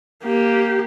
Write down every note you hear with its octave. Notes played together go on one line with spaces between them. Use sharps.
A#3 G4